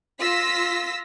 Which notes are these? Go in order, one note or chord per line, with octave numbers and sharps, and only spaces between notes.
F4 E6 A#6 B6